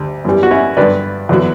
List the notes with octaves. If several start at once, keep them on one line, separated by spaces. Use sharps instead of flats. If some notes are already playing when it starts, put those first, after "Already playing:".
Already playing: D2 G3
F#2 E3 G3
F#4
C#4 E4
G2 D3 F#3 B4 D5
E2 D3 F#3